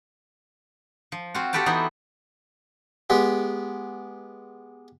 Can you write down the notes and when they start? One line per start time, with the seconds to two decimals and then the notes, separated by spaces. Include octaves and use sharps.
1.12 F3
1.34 C4 F4 F#4
1.53 F#4 G4 A4 B4 G5 A5
1.66 E3 B3 D#4 E4
3.10 G#3 B3 G4